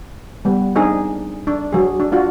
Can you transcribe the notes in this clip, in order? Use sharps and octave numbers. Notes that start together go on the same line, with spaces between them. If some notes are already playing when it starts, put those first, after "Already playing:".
G3 B3
C4 D4 D#4 G#4
D4
F#3 G#4
D4
D4 F4 F#4